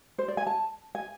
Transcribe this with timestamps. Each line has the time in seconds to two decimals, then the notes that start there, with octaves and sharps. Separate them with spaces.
0.19 C5
0.28 D5
0.37 G#5
0.47 A5
0.95 G#5